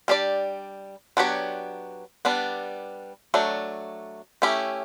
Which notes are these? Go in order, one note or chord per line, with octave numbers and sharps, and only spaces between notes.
G3 D4 G4 D5
F#3 B3 D4 G4 C#5
G3 B3 D4
F#3 A3 D4
A3 C#4 E4 G4